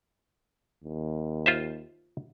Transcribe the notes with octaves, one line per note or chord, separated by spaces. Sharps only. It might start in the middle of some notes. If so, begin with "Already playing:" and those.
D#2
F4 C5 E5